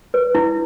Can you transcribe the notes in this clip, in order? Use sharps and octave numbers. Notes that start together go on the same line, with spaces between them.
B4
E4